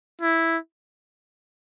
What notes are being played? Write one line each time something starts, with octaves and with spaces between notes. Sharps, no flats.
E4